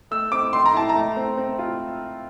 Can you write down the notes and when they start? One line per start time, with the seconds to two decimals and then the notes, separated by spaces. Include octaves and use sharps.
0.11 A3 E6
0.32 C4 D6
0.53 A3 C6
0.66 A#5
0.74 E4 A5
0.89 A#5
0.95 A3
1.17 C4
1.37 C4
1.59 F4